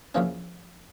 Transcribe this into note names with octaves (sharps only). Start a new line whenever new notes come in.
E2 C#3 F3 A#3 C#4